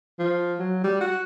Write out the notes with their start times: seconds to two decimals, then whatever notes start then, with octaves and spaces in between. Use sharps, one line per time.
0.19 F3
0.59 F#3
0.84 G3
1.01 F#4